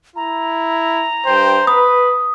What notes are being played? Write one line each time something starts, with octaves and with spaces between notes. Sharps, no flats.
E4 A#5
G2 C5 G5
B4 B5 D#6